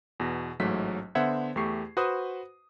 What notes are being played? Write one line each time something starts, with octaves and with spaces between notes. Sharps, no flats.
E2 B2 A#6
A1 G#2 F#3 A3 B6
D3 B3 C5 E5 F#5 G#6
E2 A3 G4 C#6 C7
F#4 B4 C5 D#6